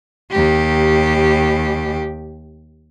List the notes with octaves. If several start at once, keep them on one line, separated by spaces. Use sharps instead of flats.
D#2 G4